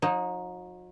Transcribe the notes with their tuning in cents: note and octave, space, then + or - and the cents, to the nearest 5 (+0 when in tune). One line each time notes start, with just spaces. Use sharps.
F#3 -45 D#4 +0